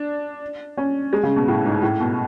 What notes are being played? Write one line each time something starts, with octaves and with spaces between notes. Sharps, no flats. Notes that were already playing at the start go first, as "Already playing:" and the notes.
Already playing: D4
C#4
G#3
C#3
B2
A2
G#2
A2
B2